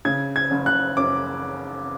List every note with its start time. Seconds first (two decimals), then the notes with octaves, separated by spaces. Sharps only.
0.05 C#3 G#6
0.36 G#6
0.51 F#1
0.66 F#6
0.97 F#2 D6